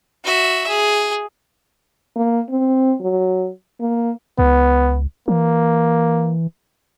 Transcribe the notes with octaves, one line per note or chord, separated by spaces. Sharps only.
F#4 E5
G#4
A#3
C4
F#3
A#3
C#2 B3
E3 A#3